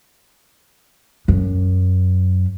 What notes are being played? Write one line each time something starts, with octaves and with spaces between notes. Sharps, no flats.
F#2